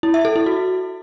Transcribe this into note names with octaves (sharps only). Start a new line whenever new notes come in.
E4
E5
A4
E4
F#4